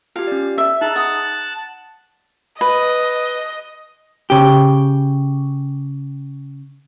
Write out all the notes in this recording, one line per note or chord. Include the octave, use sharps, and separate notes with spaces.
F4 G4 F5
C#4 D5
E5
D#4 G#4 A5 A#5 F#6
F#5 D#6
B4 D#5
C#3 G4